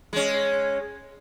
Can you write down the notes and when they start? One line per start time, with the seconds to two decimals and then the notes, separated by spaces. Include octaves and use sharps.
0.13 G#3 C#4